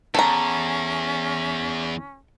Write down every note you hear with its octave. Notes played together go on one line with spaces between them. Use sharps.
E2 C#4 A4 A#5